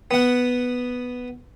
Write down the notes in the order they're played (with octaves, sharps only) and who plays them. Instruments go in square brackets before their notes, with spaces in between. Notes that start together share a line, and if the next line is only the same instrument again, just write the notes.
[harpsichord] B3 F#5